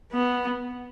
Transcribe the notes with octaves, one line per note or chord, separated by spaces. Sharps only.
B3